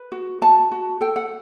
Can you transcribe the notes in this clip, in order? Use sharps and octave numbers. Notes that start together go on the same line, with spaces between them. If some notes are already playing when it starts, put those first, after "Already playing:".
Already playing: B4
F#4
F#4 A5
F#4
A4 G5
F#5